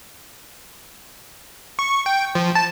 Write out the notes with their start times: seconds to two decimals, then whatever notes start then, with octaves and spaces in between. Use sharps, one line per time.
1.79 C#6
2.06 G5
2.35 F3
2.55 A5